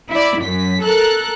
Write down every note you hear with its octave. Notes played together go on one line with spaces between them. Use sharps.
E4 D5
F#2 B6
A4 A#4 F#6